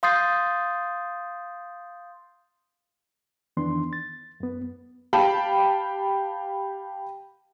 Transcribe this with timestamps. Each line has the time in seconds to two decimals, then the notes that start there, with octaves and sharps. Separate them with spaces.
0.03 F5 C6 D#6 G6 A6 C7
3.57 F2 D#3 E3 B3 D4 C6
3.93 A6
4.40 F#2 B3
5.13 G4 F5 G5 A5 B5